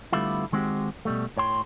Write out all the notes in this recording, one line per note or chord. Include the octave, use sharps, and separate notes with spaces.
D3 G3 A3 B3 E4 F4
D#3 G#3 C4 F#4 G4
B2 G3 A3
A2 C#5 G5 C6